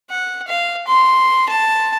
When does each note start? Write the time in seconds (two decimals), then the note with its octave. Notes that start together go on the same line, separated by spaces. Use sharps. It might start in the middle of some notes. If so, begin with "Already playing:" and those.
0.10 F#5
0.47 F5
0.87 C6
1.49 A5